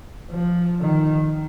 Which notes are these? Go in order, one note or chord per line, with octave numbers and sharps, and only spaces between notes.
F3
D#3